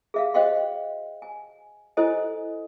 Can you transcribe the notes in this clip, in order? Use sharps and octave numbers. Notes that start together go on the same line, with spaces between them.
G#4 E5 F5
F#4 C5 D#5 F5 G5 C6
G#5
E4 A4 C5 D#5 G#5